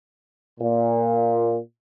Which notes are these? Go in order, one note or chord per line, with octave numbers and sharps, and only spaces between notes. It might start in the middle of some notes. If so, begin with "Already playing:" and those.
A#2